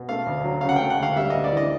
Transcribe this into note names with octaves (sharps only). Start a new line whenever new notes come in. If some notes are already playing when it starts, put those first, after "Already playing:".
Already playing: B2
A3 F5
D2
F#3
C#3 F5
F#5
A3 G5
F#5
D2 F5
G3 E5
D2 D#5
D5
E3 D#5